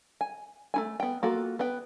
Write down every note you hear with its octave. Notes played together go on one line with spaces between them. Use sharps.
G#5
A3 E4 G#5
B3 G5
A#3 F4 F#4 A4
B3 B4 G5